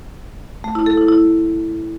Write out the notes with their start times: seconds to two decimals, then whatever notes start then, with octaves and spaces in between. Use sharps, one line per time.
0.64 A3
0.75 E4
0.86 A4
0.97 E4
1.09 E4